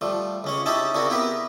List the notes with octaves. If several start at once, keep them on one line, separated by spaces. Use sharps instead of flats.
F3 G3 A3
C#2 C#4 C#5
C#4 D#4 E4 G4 E5 A5
C#3 C4 D4 E4 F#4 A#4
B3 E4 G4 A#4 B4